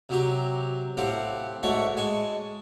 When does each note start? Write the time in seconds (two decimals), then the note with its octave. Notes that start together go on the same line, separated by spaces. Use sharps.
0.09 C3 F#3 G4 A#5
0.97 A2 C4 G4 F5 F#5 D6
1.63 G#2 A3 F#4 C#5 D5 C#6
1.97 G#3 G#5 A5 C#6